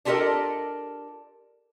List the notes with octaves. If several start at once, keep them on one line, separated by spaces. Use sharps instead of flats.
D4 F4 G4 A4 A#4 D#5